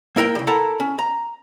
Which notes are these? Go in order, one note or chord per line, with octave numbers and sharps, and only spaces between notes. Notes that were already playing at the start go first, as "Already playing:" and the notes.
A#3 E4 A#4 F#5 G5
C#3 G3
E4 A4 A#4 F#5 A5 A#5
C#4
A#5